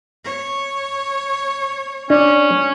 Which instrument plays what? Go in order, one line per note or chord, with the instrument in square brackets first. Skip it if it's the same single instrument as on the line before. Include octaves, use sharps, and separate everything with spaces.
[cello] C#5
[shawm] C#4 [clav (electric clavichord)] D4